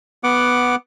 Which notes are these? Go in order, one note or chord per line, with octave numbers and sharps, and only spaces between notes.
B3 F#5 D6